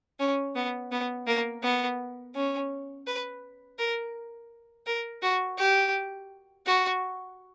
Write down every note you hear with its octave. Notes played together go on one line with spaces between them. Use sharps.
C#4
B3
B3
A#3
B3
C#4
B4
A#4
A#4
F#4
G4
F#4